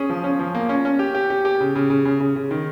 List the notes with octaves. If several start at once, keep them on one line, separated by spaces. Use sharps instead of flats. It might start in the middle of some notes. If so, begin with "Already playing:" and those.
Already playing: C#4 G#4
F3
C#4
F3
A#3
C#4
C#4
G4
G4
G4
G4
C#3
C#3
C#3
C#3
C#3
C#3
D#3